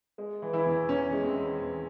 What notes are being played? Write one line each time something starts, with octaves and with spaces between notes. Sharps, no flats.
G#3
E3
E3 E4
E2
E2 C#4
G#3
C4
E3
E2